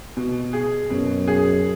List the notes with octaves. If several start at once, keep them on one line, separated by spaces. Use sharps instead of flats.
B2
G#4
F#2 B2
G#4